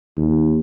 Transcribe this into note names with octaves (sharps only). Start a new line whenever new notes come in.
D#2